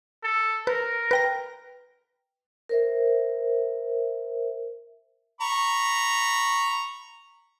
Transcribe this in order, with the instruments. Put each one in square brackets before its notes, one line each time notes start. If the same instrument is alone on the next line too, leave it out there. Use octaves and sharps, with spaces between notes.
[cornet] A4
[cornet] A#4 [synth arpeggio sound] B4
[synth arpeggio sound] B4 G5 A#6
[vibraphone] A#4 C5 E5
[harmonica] A#5 B5 C#6